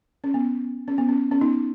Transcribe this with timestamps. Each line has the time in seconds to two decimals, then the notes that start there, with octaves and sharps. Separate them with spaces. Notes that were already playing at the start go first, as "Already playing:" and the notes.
0.24 C#4
0.34 B3
0.88 C#4
0.98 B3
1.09 C#4
1.32 C#4
1.41 B3 D#4